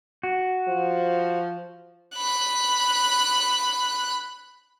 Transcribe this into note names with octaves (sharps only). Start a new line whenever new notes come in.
F#4
F3
B5 F#6